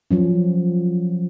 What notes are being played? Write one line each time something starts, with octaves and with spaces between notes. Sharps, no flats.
F3 F#3 C#4